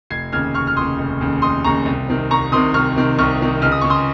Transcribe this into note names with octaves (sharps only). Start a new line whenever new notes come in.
F1 G#6 C7
D#2 C#3 F6 G#6
F1 C#6 F6
F6
D#2 C#3 C6 D#6
F1
D#2 C#3
F1 C6 D#6
D#2 C#3 A#5 C#6
C2
C3 D#3
C2 A#5 C#6
C3 D#3 C6 D#6
C2 C#6 F6
C3 D#3
C2 C#6 F6
C3 D#3
C#2 F6
D#6
C#3 C#6
C6 D#6